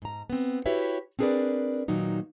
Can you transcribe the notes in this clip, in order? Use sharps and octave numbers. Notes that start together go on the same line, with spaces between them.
G#2 A#5
B3 C4
E4 F#4 G4 B4 C#5 E5
C4 D4 G#4 A#4 B4 D5
A#2 D#3 F#3 D#4